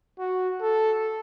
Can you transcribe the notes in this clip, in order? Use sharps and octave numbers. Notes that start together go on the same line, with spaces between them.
F#4
A4